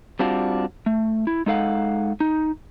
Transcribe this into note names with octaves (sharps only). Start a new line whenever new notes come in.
G3 C4 D4 F4 F#4
A3
E4
G#3 D#4 A4 F5 F#5
D#4